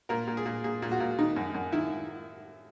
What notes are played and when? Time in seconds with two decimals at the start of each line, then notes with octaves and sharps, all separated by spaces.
0.09 A#2 A#4
0.27 A#2
0.37 G#4
0.46 A#2
0.64 A#2 G#4
0.82 A#2
0.91 F#4
1.00 A#2
1.18 D#3 D#4
1.36 F#2
1.54 F#2
1.72 D#3 E4